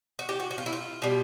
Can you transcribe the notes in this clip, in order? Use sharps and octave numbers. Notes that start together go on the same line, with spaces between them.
F#4
G4
F#4
F#4
F4
E4
F4
B2 G3